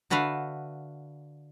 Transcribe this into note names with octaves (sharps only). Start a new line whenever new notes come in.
D3 F#4 B4 E5 F5